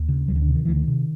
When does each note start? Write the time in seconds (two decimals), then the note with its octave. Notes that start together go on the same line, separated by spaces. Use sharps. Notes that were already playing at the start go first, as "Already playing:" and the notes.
Already playing: D#2
0.08 C#3
0.28 D2 F#3
0.36 D#3
0.41 D3
0.48 C3
0.55 D#3
0.65 D2 E3
0.76 D#3
0.88 C3